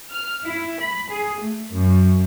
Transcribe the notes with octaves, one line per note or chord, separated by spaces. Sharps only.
F6
E4
B5
G#4
A3
F#2